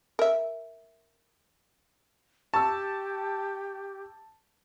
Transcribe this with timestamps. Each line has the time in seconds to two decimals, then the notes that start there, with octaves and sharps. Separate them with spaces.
0.19 A#4 E5
2.54 G4 A5 C#6 E6